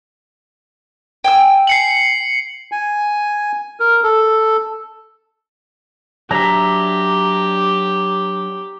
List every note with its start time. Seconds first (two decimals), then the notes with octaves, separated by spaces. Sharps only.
1.24 G5 G#5 E6
1.67 C7 C#7 F#7
2.72 G#5
3.80 A#4
4.04 A4
6.31 F#3 D4 G4 E5 A#5